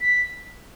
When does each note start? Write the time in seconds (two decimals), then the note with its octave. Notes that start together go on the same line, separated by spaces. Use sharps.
0.01 B6